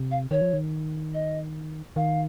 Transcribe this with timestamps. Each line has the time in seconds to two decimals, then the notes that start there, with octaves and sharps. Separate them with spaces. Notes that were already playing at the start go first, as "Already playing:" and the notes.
Already playing: C3
0.11 F5
0.31 D#3 C#5
0.41 F3
0.53 D#3
1.14 D#5
1.96 D#3 F5